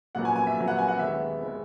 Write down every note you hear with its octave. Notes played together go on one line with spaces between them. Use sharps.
A#1 A#2 F#3 B3 F#5
G#5
G#5
E5
A#1 A#2 F#3 B3
F#5
G#5
F#5
D#2 D#3 G#3 B3 E5
D#3 G#3 B3